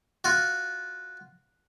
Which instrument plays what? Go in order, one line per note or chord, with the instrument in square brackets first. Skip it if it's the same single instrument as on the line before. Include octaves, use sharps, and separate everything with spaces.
[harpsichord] F4 F#4